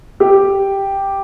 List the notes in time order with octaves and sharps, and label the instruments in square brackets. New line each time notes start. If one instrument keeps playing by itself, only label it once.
[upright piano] G4